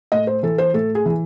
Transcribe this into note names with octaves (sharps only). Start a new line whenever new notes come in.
A2 D#5
C5
E3 A4
C5
A2 A4
G#4
E3